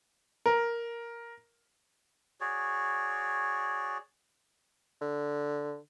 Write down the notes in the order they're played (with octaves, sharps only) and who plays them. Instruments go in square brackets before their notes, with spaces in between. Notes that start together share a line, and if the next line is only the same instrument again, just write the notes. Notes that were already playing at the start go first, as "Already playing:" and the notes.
[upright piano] A#4
[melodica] F#4 G#4 C#5 D5
[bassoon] D3